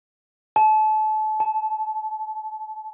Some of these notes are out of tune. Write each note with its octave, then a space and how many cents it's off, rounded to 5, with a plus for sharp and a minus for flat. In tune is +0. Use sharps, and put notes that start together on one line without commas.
A5 -30
A5 -5